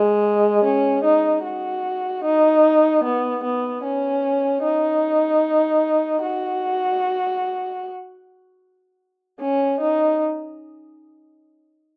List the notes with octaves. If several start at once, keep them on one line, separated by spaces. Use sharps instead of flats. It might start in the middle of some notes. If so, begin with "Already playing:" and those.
Already playing: G#3
C#4
D#4
F#4
D#4
B3
B3
C#4
D#4
F#4
C#4
D#4